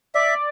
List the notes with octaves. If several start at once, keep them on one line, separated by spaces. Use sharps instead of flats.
D5 E5